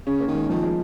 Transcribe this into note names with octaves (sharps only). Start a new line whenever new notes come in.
C#3 C#4
A#3
D#3
G#3
D#3 F3
G#3